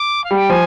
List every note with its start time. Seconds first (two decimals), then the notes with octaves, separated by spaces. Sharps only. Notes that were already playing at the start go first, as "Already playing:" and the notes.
Already playing: D6
0.24 F5
0.31 G3
0.37 G5
0.50 F3 G#5